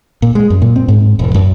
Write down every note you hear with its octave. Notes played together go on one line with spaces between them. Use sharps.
A#2
G#3
F#2
A#2
C4
G#2
E1
F#2